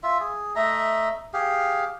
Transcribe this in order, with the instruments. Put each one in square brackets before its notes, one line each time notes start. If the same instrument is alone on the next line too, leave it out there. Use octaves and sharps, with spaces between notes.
[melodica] F4 E5
G#4
A3 D#5 E5 A#5
G4 G#4 F5